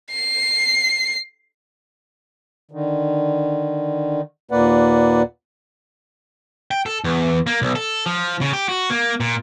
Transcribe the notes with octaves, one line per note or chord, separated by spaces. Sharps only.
C7
D3 D#3
D#2 A#2 A#3 B4 D5 F#5
G5
A4
E2
A#3
B1
A4
F3
C#3
G4
F#4
A#3
A#2